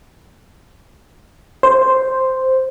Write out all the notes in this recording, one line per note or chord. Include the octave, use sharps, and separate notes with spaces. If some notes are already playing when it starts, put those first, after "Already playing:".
C5